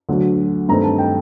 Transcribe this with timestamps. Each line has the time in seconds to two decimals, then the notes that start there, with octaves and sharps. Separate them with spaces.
0.09 D2 D3 F#3
0.69 G2 D#3 A3 C4 A#5
0.84 A5
0.99 G5